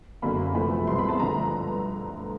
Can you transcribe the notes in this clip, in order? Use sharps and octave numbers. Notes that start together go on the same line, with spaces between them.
F#1 F#2 D3 F#3 A#3 B5
E2 C3 F3 A3 B5
C2 B2 G#3 C4 C6
B5
A5
G2 D3 F3 A3 A#5